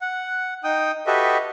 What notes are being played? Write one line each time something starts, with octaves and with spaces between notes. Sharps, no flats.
F#5
D#4 G5 D#6
F#4 G4 A4 B4 D#5 E5